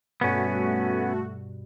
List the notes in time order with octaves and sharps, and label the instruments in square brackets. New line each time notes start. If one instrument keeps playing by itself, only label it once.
[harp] G2 B2 [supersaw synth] A3 F#4 [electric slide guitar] B3 C#4